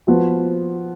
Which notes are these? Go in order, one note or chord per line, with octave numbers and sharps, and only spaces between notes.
F3 B3 F#4